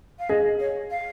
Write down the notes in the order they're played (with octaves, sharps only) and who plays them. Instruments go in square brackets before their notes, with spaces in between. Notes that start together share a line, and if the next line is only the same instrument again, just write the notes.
[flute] F5
[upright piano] G#4 [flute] D#5
[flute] C#5
F5